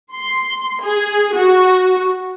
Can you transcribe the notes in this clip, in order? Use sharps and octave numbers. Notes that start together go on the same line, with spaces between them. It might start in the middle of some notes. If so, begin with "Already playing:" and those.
C6
G#4
F#4